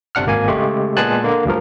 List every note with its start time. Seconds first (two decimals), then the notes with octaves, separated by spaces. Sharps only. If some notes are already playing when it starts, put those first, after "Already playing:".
0.15 G1 C3 D4 F#5 F6
0.26 G#1 A#3 G#5
0.48 C#3 G#3 A3 G4
0.97 A#2 G#3 B3 G#5 A5 F#6
1.24 D3 A#3
1.45 D2 G2 F3 A#4